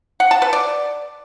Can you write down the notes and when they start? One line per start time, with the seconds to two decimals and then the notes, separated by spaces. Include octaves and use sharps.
0.20 F#5
0.31 A5
0.42 B4
0.53 D5